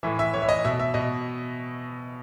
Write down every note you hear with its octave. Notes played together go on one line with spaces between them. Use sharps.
A2 E3 E5
E5
A2 E3 C#5
E5
D#5
B2 E5
E5
B2 D#5